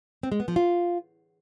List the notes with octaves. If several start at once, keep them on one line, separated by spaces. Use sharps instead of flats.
C4
G#3
B3
F3
F4